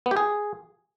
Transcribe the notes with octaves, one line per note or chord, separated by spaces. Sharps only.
B3
G4
G#4